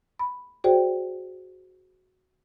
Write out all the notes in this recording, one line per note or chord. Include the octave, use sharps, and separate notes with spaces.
B5
F#4 G#4 C5 D5 G5